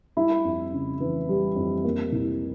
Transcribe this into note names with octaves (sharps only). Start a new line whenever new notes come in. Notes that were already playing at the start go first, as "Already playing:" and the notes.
G3 E4
F2
C#3
E3
G3
F2
A#3
C2